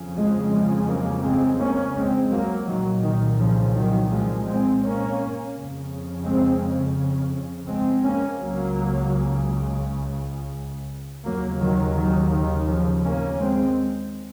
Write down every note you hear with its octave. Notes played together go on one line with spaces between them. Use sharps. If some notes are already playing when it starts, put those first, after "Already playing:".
Already playing: F2 C#3
F3 G#3
F3 G#3
F#3 A#3
G#3 C4
A#3 C#4
G#3 C4
F#3 A#3
C2 A#2 D#3 F#3
D#3
C#3 F3
D#3 F#3
F3 G#3
G#3 C4
A#3 C#4
F2 C#3
G#3 C4
G#3 C4
A#3 C#4
C#2 C#3 F#3 A#3
D#2 C#3 F#3 A#3
D#3 F#3
D#3 F#3
D#3
C#3 F3
A#3 C#4
G#3 C4